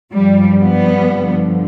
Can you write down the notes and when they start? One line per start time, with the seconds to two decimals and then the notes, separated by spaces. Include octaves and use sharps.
0.13 G2 F3 G3
0.62 G3 B3
1.10 G2 D3 F3